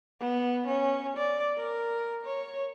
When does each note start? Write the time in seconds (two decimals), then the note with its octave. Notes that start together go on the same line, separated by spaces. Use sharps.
0.20 B3
0.67 C#4
1.17 D5
1.57 A#4
2.25 C#5